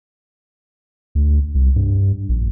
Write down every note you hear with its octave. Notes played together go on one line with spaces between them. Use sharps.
D2
C2
G2
A#1